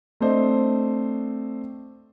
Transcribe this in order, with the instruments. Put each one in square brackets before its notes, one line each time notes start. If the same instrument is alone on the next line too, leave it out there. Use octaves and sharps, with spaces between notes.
[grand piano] A3 C4 D4 C5 D#5